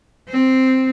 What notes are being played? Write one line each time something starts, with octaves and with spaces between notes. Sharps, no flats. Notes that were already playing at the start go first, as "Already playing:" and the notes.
C4